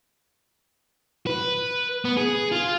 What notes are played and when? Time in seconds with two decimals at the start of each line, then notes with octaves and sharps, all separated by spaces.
1.27 B4
2.05 B3
2.17 G#4
2.52 F4